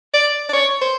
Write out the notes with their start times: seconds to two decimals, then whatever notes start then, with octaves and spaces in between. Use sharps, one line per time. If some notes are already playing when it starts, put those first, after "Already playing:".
0.14 D5
0.49 D5
0.53 C#5
0.82 C5